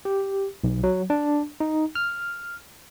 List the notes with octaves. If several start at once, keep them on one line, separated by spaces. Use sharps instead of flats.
G4
B1
F#3
D4
D#4
F6